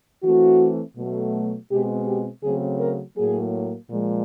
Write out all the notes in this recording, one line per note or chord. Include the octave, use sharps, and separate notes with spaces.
E3 A3 C4 F#4
B2 F#3 A3
B2 G#3 C4 G4
G4
C#3 F#3 A3 C4 G#4
A#4
A2 F#3 A#3 G#4
A#2 F3 G#3